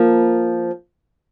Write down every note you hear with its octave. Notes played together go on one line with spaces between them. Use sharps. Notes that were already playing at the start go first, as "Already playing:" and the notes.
Already playing: F3 A#3